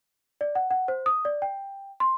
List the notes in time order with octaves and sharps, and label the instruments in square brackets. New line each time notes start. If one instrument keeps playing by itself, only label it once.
[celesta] D5
F#5
F#5
C5
D#6
D5
G5
C6